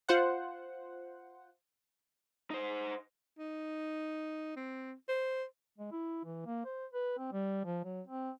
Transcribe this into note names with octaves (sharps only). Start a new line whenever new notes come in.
F4 C5 F#5
D#4 C5
D#4
C4
C5
G#3
E4
E3
A#3
C5
B4
C4
G3
F3
F#3
C4